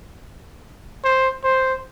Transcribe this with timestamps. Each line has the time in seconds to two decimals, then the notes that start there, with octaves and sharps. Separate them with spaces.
1.04 C5
1.44 C5